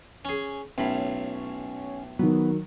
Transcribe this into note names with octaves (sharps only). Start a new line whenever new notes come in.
C#4 G#4
B1 A2 C#4 B5
D#3 F#3 B3